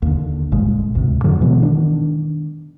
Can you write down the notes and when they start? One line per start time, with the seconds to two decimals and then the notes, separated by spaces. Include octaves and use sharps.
0.02 D#2 D3
0.52 G1 A#2 G#3
0.95 D2 G#2 C3
1.24 F2 D3 F3 F#3
1.41 B2 E3 G#3 B3
1.62 D#3 D4